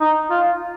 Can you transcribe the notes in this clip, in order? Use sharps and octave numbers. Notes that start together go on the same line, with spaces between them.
D#4
F4